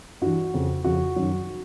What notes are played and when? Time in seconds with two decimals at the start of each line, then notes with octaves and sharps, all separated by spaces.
0.21 G2 E3 F#4
0.54 F2 C#3 F3
0.84 F2 C#3 F3 F#4
1.16 F#2 D#3 F#3